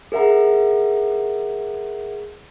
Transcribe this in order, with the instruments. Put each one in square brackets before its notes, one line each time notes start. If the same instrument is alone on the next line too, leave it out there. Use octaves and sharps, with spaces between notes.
[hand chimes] G#4 A#4 E5 F#5 A#5